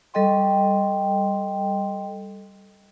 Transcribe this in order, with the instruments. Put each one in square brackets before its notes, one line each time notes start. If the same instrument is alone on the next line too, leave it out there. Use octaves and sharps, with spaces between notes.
[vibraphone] G3 A4 D#5 G5 C6